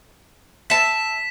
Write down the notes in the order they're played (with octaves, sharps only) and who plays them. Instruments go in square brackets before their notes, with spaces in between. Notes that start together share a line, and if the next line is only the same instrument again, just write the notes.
[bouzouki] E5 A5 [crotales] B6 E7